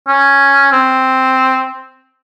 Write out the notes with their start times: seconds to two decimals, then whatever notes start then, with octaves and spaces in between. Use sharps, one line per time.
0.08 C#4
0.72 C4